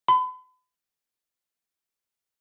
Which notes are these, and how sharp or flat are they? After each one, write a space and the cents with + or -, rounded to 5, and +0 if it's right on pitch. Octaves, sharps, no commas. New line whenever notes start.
B5 +40